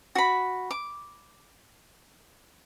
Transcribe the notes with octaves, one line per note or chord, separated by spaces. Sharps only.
F#4 B5
D6